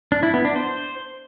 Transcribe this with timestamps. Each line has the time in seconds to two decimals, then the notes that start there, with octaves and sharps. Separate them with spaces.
0.12 D4
0.23 E4
0.34 B3
0.45 D4
0.56 C5